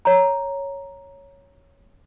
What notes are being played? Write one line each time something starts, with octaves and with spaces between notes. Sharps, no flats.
C#5 A#5